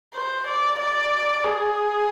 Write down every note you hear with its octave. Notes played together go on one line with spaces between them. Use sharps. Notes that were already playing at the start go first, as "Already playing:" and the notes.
C5
D5
D5
G#4